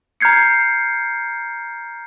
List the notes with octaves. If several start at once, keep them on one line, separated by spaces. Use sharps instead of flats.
A#5 F6 G6 G#6 C7 C#7